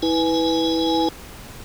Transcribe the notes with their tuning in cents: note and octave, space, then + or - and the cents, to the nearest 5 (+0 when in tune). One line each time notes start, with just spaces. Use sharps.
E4 -25 B4 +0 G#5 +10